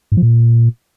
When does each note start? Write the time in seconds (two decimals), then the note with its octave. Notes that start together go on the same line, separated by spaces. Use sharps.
0.12 G#2
0.17 F3
0.23 A#2